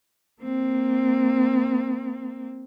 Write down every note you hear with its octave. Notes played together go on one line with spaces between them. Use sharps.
A#3 C4